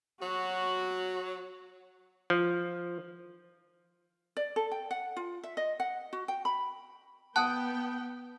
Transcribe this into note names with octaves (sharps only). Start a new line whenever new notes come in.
F#3 F#4
F3
D5
A4
G5
F#5
F4
E5
D#5
F#5
F#4
G5
B5
B3 F#5 G5 A5 D#6